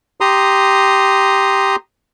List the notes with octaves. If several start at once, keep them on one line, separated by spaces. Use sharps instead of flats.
G4 A#5 C6 D#6